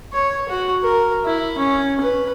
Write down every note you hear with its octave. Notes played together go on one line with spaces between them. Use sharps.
C#5
F#4
A#4
E4
C#4
B4